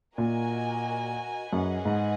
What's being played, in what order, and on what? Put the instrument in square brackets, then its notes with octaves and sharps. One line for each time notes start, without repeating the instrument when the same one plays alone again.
[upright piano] A#2 [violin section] F#4 A#4 D#5 G#5
[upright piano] F#2 [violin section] G#4 B4 D#5 F#5
[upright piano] G#2